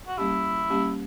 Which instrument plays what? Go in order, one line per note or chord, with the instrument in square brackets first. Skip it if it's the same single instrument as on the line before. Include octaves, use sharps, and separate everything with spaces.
[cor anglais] F#4
[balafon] G3 A#3 C#4 G4 [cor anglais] E4
[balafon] G3 A#3 C#4 G4